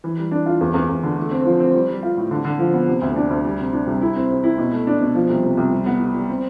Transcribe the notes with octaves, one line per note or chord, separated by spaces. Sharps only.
E3
G3
D4
F4
E2
E2
E2
D3
A3
C4
F3
C4
G3
G3
F4
A2
D3
D3
F3
B3
C3
D2
D4
D2
G3
C3
D4
C2
E4
C4
C3
E4
B2
A3
D4
B2
F3
C2
C3
C2
G3
B3
G3
G3
C4